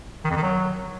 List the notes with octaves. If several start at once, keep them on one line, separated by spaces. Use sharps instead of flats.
D#3
F2
D#3
F#3